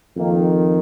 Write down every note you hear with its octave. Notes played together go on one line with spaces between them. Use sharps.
F2 D#3 A#3